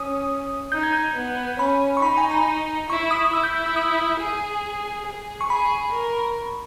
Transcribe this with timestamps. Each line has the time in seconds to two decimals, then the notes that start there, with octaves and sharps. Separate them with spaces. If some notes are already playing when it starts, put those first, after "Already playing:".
Already playing: C#4 D#6
0.72 D#4 G6
0.83 G#6
0.93 G6
1.16 B3
1.59 C#4 B5
1.97 C#6
2.02 D#4 B5
2.17 G#5
2.31 A#5
2.89 E4 C#6
3.11 D#6
3.25 D#6
3.33 E4 E6
3.43 G6
3.54 G6
3.66 E6
3.76 D#6
4.20 G#4
5.06 G#4
5.41 C#6
5.50 G#4 B5
5.93 A#4